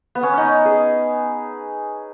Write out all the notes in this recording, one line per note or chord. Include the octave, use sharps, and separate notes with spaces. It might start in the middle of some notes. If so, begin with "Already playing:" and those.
B3
C#4
C#4 D#4
G#4